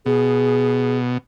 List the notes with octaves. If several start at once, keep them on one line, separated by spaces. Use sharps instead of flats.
B2 G#4